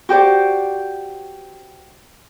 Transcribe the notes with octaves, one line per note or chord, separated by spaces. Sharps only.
F#4 G4 C5 D5